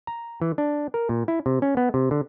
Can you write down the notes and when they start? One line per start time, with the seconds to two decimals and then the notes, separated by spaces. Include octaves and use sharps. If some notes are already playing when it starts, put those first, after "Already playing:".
0.07 A#5
0.42 E3
0.58 D4
0.94 A#4
1.09 A#2
1.28 E4
1.46 C3
1.62 C#4
1.77 B3
1.94 C3
2.11 D3